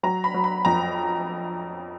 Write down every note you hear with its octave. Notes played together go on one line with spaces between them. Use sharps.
F#3 A#5
B5
F#3
B5
F2 A#5